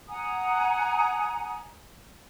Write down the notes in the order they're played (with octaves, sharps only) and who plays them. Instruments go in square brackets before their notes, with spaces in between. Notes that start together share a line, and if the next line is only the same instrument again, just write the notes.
[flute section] F#5 G#5 A#5 D#6